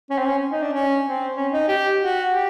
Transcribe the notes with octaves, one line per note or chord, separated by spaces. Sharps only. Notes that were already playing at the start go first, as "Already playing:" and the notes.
C#4
C4
C#4
D#4
D4
C#4
C4
C#4
D#4
G4
F#4
G4